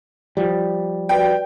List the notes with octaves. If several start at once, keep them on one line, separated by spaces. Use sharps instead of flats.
F3 G3
F#4 B4 D5 G5